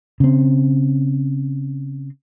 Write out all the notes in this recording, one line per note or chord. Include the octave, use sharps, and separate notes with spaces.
C#3 C4